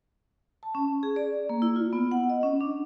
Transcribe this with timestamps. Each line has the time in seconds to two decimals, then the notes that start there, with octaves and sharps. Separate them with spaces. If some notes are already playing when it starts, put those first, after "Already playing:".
0.63 A5
0.75 C#4
1.03 G#4
1.16 D5
1.49 A#3
1.62 E4
1.76 F4
1.93 B3
2.11 F#5
2.30 D#5
2.43 C#4
2.61 D4